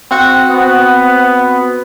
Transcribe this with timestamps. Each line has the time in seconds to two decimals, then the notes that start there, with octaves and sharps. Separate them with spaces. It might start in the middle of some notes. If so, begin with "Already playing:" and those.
0.11 C4 F#4 F#5
0.50 B3